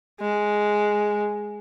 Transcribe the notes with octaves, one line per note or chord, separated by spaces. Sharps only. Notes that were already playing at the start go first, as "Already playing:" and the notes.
G#3